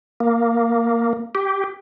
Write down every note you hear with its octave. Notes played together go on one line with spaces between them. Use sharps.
A#3
G4